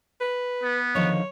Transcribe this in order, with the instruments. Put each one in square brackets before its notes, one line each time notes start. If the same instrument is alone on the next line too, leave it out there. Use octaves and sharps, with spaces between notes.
[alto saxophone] B4
[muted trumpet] B3
[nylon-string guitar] D3 D#3 F3 [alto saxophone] C#5